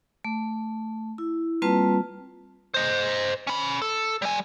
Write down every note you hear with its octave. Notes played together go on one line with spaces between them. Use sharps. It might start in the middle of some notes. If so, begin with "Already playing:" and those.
A3
E4
G3 A#3 C4 F4 B4 A5
C5 D#5
C#4 B5
A4
G3 G#5